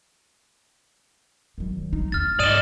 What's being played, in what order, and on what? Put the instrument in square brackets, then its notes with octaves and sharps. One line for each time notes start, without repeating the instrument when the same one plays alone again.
[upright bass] D#3 F#3
D#4
[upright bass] E2 [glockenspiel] F6 A6
[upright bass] G#2 [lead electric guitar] D5 D#5 [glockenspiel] D#6 D#7 E7